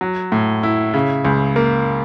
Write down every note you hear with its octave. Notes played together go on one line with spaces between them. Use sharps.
F#3
A2
E4
C#3
C#2
A#3